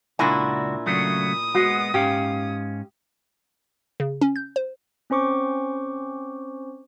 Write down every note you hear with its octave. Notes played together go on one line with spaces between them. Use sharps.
C#2 A#2 D4 E4 F#4 G#5
C#3 F#3 A3 D#6
G#3 B3 F#4
G#2 C#4 G4 F5
C#3
C#4
G6
C5
C4 C#4 C5 C#6 D6